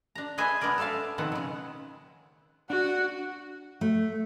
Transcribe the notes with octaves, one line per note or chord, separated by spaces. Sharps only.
D4 A#5
G#4 B4 C5 D#5 E5 G#5
G#3 B3 D4 A#4 D5
A4 C5 E5 F5 A5
B2 D#3 F3 C4 F#5
C#3 G#3
D4 F#4 F#5
A3